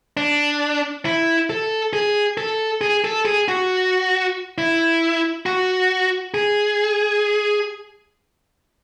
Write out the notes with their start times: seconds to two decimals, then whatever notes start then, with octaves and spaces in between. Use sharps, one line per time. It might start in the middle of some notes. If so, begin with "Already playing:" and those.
0.17 D4
1.05 E4
1.50 A4
1.93 G#4
2.37 A4
2.81 G#4
3.04 A4
3.25 G#4
3.48 F#4
4.58 E4
5.46 F#4
6.34 G#4